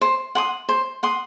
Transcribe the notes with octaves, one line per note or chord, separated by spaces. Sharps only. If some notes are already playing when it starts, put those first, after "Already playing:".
C5
F#5 C6 D#6
C5
F#5 C6 D#6